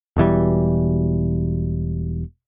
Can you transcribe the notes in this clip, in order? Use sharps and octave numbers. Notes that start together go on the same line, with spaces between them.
E1 B2 E3 G3